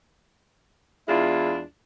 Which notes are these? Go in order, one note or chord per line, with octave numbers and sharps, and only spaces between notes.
E2 G#3 D4 E4 F4